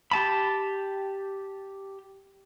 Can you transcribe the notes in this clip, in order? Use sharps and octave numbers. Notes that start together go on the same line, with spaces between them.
G4 A5 B5